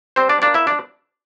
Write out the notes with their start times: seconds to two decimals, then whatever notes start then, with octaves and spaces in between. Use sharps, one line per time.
0.16 G3 C4 C5
0.29 D4 D5
0.42 A#3 D4 D5
0.54 E4 E5
0.67 D4 D5